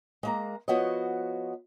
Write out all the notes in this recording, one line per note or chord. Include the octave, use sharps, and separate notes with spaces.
G#3 A#3 A#5
F3 B3 F#4 C#5 D#5